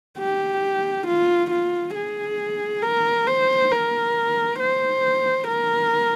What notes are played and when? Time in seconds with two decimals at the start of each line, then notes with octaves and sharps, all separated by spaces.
0.18 G4
1.07 F4
1.51 F4
1.95 G#4
2.83 A#4
3.27 C5
3.72 A#4
4.60 C5
5.48 A#4